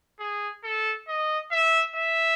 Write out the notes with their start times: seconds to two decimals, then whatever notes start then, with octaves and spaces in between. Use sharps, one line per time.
0.20 G#4
0.64 A4
1.08 D#5
1.52 E5
1.96 E5